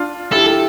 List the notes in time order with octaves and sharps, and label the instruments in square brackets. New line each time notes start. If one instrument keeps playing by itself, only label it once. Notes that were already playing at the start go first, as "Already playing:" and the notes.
Already playing: [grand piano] D4 F4
[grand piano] E4 G4 [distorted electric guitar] A4